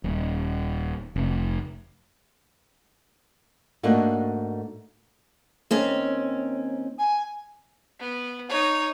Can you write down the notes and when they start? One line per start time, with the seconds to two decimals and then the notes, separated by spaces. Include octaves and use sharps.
0.04 D#1
1.16 F1
3.83 G#2 A3 A#3 D4 D#4 F#4
5.71 D#2 C4 C#4
6.98 G#5
8.00 B3
8.49 D#4 C#5